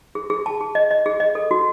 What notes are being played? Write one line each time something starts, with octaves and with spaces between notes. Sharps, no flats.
G#4
G#4
A5
G#4
D#5
D#5
G#4
D#5
A4
F#4